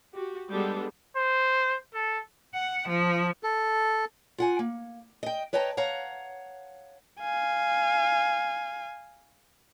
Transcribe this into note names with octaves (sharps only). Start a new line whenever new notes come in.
F#4 G4
G3 G#3 B3 D4 G4 A4
C5
A4
F#5
F3
A4
F4 F#5 G#5
A#3
D#5 G5
B4 C#5 D#5 G5 A5 A#5
C#5 F5 F#5 A#5
F5 G#5